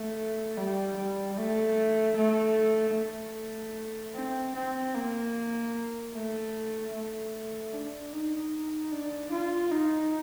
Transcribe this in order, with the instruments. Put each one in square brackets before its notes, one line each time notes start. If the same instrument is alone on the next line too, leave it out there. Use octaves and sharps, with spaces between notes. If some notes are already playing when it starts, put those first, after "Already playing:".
Already playing: [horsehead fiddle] A3
G3
G3
A3
A3
A3
C4
C4
A#3
A3
A3
D4
D#4
D4
F4
D#4